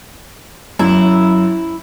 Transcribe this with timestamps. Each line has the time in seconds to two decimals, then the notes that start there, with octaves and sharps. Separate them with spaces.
0.79 F#2 E4